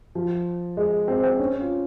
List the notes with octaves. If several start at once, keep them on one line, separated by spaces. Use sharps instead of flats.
F3
G#3
C4
C4
C#4
F4